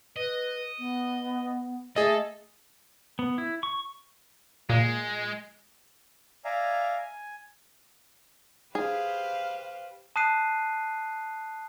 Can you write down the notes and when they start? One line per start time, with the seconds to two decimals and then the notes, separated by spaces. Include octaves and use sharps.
0.16 B4 D#5
0.79 B3
1.96 A3 G#4 A4 D#5
3.19 B3
3.38 E4
3.63 C#6
4.70 A#2 G#3
6.45 D5 E5 F5 G#5 A#5
6.98 G#5
8.75 G4 G#4 B4 C5 F5
10.16 A5 D#6 F#6 C7 D#7